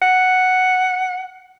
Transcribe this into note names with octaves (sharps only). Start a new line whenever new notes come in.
F#5